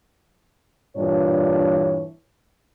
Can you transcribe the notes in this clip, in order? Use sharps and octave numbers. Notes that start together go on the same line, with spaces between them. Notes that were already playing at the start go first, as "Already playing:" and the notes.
G2 A#2 E3 D4 C#5